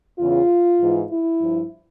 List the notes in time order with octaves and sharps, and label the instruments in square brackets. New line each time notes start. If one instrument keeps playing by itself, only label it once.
[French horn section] E2 C#3 E3 F4
G#2 E3
E4
G2 F3